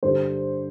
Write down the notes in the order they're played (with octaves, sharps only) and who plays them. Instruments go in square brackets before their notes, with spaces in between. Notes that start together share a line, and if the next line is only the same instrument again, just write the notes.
[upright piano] G2 D3 G3 C5